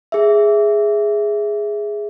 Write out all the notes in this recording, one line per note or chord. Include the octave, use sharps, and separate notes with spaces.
G#4 E5